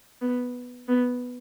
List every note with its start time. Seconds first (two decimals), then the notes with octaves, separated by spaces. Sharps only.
0.21 B3
0.88 B3